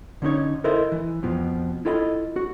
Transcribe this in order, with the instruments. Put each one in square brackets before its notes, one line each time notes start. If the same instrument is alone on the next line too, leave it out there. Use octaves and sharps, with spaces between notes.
[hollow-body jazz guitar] D3 C#4 D#4 C#5
E4 A4 A#4 C5 D#5 E5
E3
F2 B2 F3
E4 F4 A4 D#5 F#5 B5
F#4